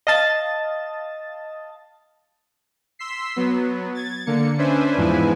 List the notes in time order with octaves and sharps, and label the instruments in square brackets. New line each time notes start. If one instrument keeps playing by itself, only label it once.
[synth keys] D#5 F5 A5 A6
[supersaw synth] C6 E6 B6 C7
F#3 B3
G#6 A6
D3 A#3 C#7
C#4 D4 B4 C5 E5 G#5
E2 G#2 F3 E4 B4 G#5